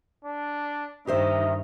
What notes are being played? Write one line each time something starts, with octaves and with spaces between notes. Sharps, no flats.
D4
G2 D#3 G4 C5 D#5 E5